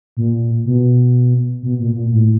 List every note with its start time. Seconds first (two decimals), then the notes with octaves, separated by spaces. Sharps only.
0.17 A#2
0.65 B2
1.63 B2
1.79 A#2
1.95 A#2
2.12 A2